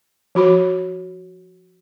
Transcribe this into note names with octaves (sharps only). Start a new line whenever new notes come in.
F3 F#4 B5